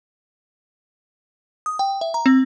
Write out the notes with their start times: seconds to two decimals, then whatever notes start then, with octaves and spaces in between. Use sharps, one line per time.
1.66 D#6
1.79 G5
2.01 E5
2.14 A#5
2.26 C4